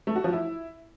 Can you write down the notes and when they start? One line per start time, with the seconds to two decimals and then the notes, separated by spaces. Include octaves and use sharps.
0.07 A3
0.16 F#4
0.24 F3
0.33 E4